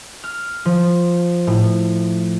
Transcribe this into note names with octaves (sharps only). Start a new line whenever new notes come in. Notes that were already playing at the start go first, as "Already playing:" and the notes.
F6
F3
A2